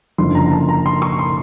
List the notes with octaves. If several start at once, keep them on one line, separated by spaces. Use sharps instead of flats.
F#1 F#2 D3 F3 C6
A#5
A#5
A5
A#5
C6
C#6
C6